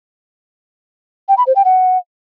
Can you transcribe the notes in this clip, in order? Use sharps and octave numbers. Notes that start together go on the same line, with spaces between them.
G5
B5
C5
G5
F#5